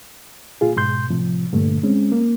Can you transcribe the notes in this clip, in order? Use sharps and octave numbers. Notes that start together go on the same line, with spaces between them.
A#2 F4 G#4
G#2 B2 C6 G6
A2 C3 F3
G2 A#2 D3 A3
G#3 C4 C#4
A#3